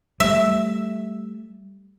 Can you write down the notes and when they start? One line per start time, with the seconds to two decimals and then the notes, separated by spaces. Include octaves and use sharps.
0.20 G3 A3 E5